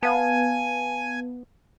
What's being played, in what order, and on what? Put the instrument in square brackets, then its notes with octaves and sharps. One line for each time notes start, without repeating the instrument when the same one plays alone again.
[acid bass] B3 [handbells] F5 A5 [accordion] G#5